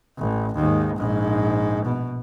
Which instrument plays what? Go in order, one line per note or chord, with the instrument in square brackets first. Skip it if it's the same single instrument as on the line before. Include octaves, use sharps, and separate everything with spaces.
[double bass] A1
D#2 G#2
A#1 G#2
B2